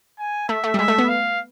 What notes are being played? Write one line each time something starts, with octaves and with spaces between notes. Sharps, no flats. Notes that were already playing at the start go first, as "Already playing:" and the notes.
G#5
A3 E5
A3
G3
G#3 E5
A3
B3
F5